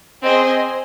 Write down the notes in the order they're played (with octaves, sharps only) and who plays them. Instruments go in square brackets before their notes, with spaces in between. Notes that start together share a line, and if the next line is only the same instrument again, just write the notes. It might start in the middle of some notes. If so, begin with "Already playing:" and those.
[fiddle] C4 [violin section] G#4 C5 D#5 G#5